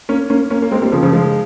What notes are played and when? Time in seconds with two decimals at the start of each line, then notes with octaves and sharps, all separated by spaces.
0.09 A#3 C#4
0.30 A#3 C#4
0.51 A#3 C#4
0.62 A#3
0.71 G#3 C4
0.82 G3 A#3
0.92 C#3 F3
1.03 C#3 F3
1.13 F3 G#3